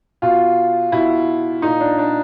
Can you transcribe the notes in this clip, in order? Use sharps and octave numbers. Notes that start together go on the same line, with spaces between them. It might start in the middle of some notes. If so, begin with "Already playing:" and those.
B2 F4
B2 E4
A#2 D#4
D4
D4